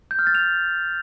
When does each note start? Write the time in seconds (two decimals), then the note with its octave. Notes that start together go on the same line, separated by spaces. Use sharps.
0.11 G6
0.19 F6
0.27 A6
0.35 F7